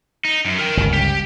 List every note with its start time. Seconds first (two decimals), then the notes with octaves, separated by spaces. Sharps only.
0.25 D#4
0.45 F#2
0.59 A#4 G5
0.77 G1 C#2
0.93 G4